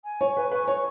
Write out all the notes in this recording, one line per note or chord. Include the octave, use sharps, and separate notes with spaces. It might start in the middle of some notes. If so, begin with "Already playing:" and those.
G#5
C#5 C#6
B4 G#5
B4 C#6
C#5 C#6